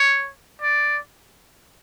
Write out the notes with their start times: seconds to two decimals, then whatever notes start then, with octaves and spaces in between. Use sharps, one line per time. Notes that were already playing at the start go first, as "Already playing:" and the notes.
Already playing: C#5
0.62 D5